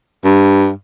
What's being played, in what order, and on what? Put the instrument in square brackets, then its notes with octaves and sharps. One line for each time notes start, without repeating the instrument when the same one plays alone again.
[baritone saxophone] G2